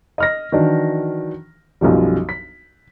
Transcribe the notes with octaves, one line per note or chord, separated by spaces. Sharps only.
D#5 F6 A#6
D#3 E3 F#3 D4
B1 F#2 F3 G3
B6